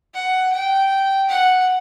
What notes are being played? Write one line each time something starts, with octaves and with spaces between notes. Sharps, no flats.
F#5
G5
F#5